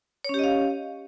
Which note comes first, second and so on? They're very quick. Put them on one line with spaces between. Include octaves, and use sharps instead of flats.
C#5 C#4 G4 D#5 F5